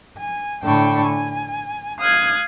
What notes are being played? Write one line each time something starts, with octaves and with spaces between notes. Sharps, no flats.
G#5
A2 D3 G5 A5 B5 C#6
G#5
F5 D#6 F6 F#6 G#6